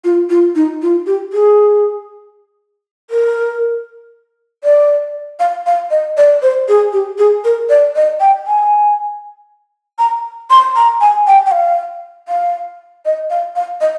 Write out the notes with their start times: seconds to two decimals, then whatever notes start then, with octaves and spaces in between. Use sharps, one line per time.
0.04 F4
0.30 F4
0.55 D#4
0.82 F4
1.06 G4
1.33 G#4
3.10 A#4
4.64 D5
5.39 F5
5.66 F5
5.90 D#5
6.17 D5
6.42 C5
6.68 G#4
6.92 G4
7.18 G#4
7.44 A#4
7.69 D5
7.95 D#5
8.20 G5
8.46 G#5
9.98 A#5
10.50 C6
10.75 A#5
11.01 G#5
11.27 G5
11.46 G5
11.51 F5
12.28 F5
13.05 D#5
13.30 F5
13.56 F5
13.81 D#5